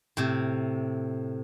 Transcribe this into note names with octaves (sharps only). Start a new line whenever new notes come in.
A2 C3